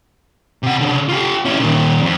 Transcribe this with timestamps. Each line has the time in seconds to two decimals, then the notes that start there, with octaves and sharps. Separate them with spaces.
0.63 C3 F#5
0.80 C#3 D4
1.09 F4 G4
1.45 C#4 E4
1.60 A#2 D#3
2.01 F2